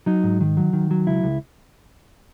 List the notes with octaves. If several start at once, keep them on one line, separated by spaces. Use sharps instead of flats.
F#3 D#4
G#2
D#3
F#3
D#3
F#3
C#2 E4
C#2